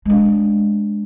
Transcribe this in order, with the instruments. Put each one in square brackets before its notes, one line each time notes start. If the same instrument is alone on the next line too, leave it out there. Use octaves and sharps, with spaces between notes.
[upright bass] G#3 D4